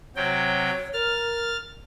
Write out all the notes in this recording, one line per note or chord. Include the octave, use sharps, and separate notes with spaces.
C3 F#3 C#5 G5
A#4 F6 A6